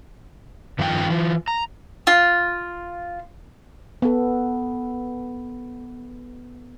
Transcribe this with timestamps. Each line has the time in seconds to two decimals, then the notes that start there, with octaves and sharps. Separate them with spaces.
0.79 G2 D#3 F3 F4 G4 G5
1.10 E3 F4
1.48 A#5
2.07 F4
4.02 B3 A4